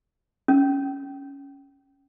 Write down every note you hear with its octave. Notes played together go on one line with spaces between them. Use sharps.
C#4